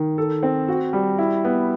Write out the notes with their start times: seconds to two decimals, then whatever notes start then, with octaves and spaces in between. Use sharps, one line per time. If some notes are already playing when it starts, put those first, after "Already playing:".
Already playing: D#3
0.18 A4
0.43 C4
0.69 F#4
0.93 G3
1.18 E4
1.45 B3